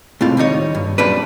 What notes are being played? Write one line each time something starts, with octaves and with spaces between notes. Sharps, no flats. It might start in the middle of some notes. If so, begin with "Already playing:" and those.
C#2 A2 C3 F4
D#2 G3 D#4 C#5
G2
F#2 A#2 G3 D4 B4